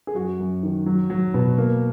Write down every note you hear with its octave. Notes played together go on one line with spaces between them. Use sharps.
G#4
F#2 F#4
F#2
D#3
F#3
F#3
B2
A#3